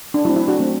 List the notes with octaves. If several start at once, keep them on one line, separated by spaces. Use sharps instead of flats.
D4
F#3 A3 C4 E4
E4
D4 F#4
F#3 A3 C4